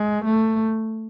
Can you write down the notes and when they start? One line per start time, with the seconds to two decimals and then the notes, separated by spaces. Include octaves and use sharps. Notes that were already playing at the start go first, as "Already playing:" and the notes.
Already playing: G#3
0.25 A3